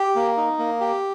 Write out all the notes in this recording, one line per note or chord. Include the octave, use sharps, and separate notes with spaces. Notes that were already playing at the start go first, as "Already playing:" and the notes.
Already playing: G4
A#3
D#4
A#3
G4